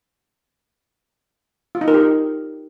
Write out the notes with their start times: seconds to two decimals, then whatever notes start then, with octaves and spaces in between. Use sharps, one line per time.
1.75 F4
1.81 D#4
1.88 A#4
1.94 G4
2.01 D#4